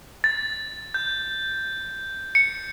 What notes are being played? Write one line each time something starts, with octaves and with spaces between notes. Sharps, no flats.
A6
G6
C#7